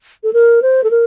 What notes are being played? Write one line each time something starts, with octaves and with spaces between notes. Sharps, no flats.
A4
A#4
C5
A4
A#4